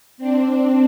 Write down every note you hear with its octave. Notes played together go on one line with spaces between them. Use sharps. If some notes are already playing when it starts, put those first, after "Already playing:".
C4 D4